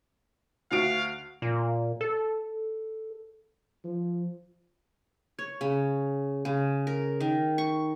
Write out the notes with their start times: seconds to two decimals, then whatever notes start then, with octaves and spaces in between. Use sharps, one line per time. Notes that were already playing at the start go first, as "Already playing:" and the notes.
0.71 D2 F#4 F5 D7
1.42 A#2
2.01 A4
3.84 F3
5.39 C#5
5.61 C#3
6.45 C#3
6.87 A#4
7.20 D#3
7.58 C#6